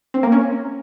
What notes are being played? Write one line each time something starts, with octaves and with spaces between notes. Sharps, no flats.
C4
A#3
C#4